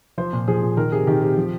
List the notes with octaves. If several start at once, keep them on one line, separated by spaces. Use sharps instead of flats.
F3 C5
A#2
F3 G#4
A#2
D#3 A#4
C3 G#4
D#3 G4
C3
F3